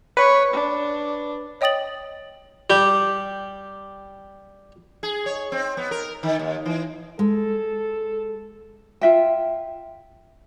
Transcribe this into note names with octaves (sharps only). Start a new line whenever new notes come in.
B4 C#5
D4
C#5 D#5 G5 D#6 A6 F#7
G3 G4
G#4
C#5
C4
B3
A#4
D#3
D#2
E3
G#3 A4
F4 E5 G5